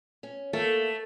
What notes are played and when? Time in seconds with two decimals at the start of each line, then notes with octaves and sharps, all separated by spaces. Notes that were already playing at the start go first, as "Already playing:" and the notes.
0.23 C#4
0.53 A3 A#3 A4